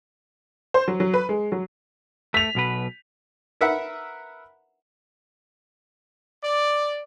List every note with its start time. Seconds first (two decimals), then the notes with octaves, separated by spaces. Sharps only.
0.74 C5
0.88 F#3
1.00 F#3
1.14 B4
1.29 G#3
1.52 F#3
2.34 A3 B6 F7
2.55 B1 B2 B4
3.61 A#4 B4 E5 F#5
6.43 D5